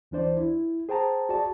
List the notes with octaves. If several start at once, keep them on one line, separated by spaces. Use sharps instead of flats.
D2 E3 D4 C5 D5
E4
G#4 C5 G5 A5 A#5
F#4 G#4 D5 A5